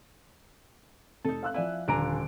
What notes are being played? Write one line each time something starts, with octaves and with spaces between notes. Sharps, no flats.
F1 D#4 A4
F5 E6 F#6
F3 E4 D5 F5 G#5
D#1 D3 D4 G#5 A#5 D7